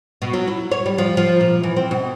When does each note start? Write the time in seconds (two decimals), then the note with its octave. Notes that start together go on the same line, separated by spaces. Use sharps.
0.22 B2
0.33 F#3
0.48 E4
0.71 C#5
0.86 G3
0.98 F3
1.17 F3
1.41 A#2
1.64 E3
1.76 C4
1.91 B2